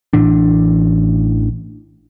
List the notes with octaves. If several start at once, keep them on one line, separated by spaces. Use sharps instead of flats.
A1 A2 E3 D4